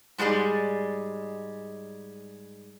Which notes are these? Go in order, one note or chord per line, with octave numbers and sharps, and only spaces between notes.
G#2 G3 G#3 G#4 D5